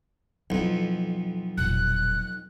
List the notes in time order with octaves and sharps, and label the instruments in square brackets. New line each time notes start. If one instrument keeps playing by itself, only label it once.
[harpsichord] B1 F2 [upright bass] F3 E4
[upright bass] E1 A#2 [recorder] F#6